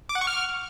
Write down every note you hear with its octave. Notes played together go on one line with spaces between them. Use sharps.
D6
F#5
C#6
F6